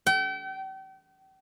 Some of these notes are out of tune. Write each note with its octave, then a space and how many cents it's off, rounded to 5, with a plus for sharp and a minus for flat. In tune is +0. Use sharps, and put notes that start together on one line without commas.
G5 -40